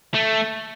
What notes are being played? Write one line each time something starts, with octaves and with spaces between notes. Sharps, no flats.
A3